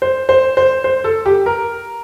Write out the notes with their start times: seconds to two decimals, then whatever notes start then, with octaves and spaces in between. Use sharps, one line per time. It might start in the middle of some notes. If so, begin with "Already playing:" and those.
0.02 C5
0.29 C5
0.57 C5
0.84 C5
1.04 A4
1.26 G4
1.46 A#4